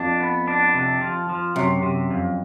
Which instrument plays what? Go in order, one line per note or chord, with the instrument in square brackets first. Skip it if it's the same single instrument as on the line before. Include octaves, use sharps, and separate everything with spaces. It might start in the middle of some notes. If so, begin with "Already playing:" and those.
Already playing: [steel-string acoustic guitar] F2 [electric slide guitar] D4
[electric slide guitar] B3
D4
C3
F3
F3
[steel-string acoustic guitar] F#2 [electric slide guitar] C3
[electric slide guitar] C3
F2